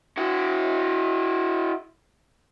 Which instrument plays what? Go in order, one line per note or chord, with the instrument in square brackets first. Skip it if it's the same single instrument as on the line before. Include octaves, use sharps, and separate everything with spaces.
[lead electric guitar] E4 F#4